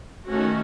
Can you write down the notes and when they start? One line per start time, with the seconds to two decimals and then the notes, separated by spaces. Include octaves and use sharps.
0.26 D#3 A3 C#4 F#4